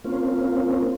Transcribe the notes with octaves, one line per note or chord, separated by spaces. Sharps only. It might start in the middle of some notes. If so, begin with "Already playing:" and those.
A#3 C4 C#4 F4